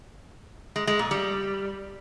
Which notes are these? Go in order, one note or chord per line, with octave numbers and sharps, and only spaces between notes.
G#3
G#3
A#2
G3